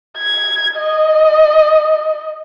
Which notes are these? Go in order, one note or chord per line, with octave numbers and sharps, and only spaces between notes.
G#6
D#5